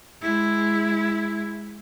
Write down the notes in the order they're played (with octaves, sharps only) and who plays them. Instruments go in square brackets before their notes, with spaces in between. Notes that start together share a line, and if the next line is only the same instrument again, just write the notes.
[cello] G#3 E4